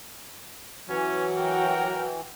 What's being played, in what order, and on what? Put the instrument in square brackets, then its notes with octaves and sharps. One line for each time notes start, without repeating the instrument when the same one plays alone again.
[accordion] E3 [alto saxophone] F#3 [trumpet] C#4
[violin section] F#4 G5 [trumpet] A#4